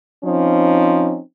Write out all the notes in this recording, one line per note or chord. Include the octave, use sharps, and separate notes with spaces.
F3 C4 C#4 D#4